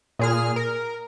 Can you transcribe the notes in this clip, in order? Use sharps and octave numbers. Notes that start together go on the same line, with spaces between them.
A#2 G#4 F6
A#4